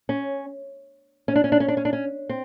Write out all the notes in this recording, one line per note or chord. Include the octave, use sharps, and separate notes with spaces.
C#4
C#4
D4
C#4
D4
C#4
D4
C#4
D4
C#4
C4